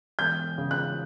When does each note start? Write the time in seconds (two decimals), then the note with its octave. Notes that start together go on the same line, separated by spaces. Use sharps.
0.19 E1 G6
0.58 C#3
0.71 F#6